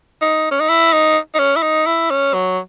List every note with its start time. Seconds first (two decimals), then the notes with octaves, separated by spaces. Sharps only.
0.22 D#4
0.51 C#4
0.60 D#4
0.70 E4
0.93 D#4
1.35 D#4
1.39 C#4
1.57 E4
1.62 D#4
1.86 E4
2.10 C#4
2.34 F#3